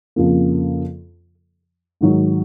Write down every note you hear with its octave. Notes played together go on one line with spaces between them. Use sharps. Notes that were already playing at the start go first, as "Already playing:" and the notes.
F2 C#3 F3 A#3
G#2 D#3 F#3